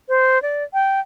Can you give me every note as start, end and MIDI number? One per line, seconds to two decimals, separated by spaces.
0.09 0.41 72
0.42 0.64 74
0.73 1.00 79